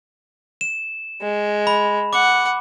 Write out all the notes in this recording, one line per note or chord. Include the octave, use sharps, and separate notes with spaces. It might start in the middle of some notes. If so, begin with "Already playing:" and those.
E7
G#3
B5
F#5 D6